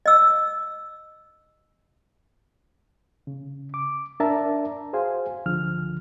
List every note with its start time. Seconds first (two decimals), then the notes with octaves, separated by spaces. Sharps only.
0.06 D#5 E6
3.27 C#3
3.74 D6
4.20 D4 A#4 D5 E5 A5 A#5
4.93 F#4 G#4 C5 F5 G#5
5.46 C#2 D3 F3 F6